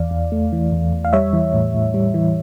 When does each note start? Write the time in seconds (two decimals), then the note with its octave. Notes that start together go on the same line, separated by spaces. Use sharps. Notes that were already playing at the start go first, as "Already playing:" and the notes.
Already playing: E2 E3 D5 F5
0.11 E2
0.32 A3
0.52 E3
0.72 E2
0.92 E2
1.05 F5
1.13 G3 C#5 E5
1.33 E3
1.54 A2
1.74 A2
1.94 G3
2.14 E3